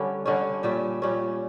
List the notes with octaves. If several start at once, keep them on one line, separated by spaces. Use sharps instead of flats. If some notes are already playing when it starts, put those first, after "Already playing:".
Already playing: D3 G3 C#4
D3 G3 C#4
A#2 G3 C#4 E5
A#2 G3 C#4